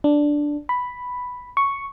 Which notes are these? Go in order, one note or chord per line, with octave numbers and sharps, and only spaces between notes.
D4
B5
C#6